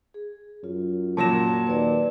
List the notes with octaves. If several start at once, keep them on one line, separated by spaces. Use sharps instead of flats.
G#4
F#2 F4
A#2 F#3 A5 A#6 E7
D#2 B4 D5